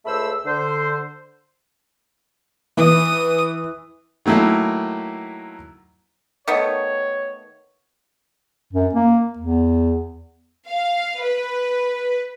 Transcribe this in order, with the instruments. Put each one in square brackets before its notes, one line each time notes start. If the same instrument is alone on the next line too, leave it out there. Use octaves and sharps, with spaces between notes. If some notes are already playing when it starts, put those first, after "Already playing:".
[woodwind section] C#2 A3 C5 B5 E6
D3 C5
[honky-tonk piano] E3 [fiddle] D#6
[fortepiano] D#3 F#3 A3 A#3 E4
[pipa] D#3 A3 B3 [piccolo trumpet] C#5
[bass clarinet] F#2
A#3
E2
[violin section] F5
B4